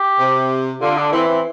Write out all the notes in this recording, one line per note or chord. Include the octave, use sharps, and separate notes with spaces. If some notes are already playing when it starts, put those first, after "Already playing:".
Already playing: G4
C3
D3 F4
D4
E3 C4
C4